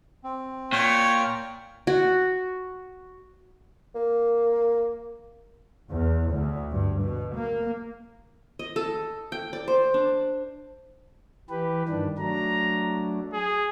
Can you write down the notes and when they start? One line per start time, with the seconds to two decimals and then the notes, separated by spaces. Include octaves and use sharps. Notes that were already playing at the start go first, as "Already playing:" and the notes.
0.24 C4
0.73 A#2 C#5 G5 F6
1.87 F#4
3.95 A#3
5.89 E2
6.30 D2
6.71 G2
7.02 B2
7.36 A#3
8.59 D#5
8.76 A4
9.32 G5
9.53 D5
9.68 C5
9.94 D4
11.50 E3 G4 B4
11.89 G2 D#3 D4
12.19 F#3 A3 D4 A#5
13.33 G#4